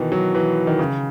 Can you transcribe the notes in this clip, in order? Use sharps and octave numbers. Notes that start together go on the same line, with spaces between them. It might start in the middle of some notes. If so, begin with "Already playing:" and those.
Already playing: B2 D#3 E3
F#3
E3
D#3
C#3